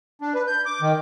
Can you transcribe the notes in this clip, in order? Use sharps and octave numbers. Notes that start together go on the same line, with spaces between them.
D4
B4
G6
D6
D#3